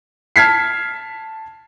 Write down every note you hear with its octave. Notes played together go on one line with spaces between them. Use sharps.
A5 F6 G#6 B6 C7